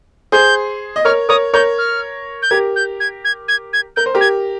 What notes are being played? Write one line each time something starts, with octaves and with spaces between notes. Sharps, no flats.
G#4 C5 G6
D#5
A#4 C#5 F6
A#4 C#5 D#6
A#4 C#5 G6
F6
G6
G4 A#4 G#6
G6
G#6
G#6
G#6
G#6
A#4 G6
C5
G4 A#4
G#6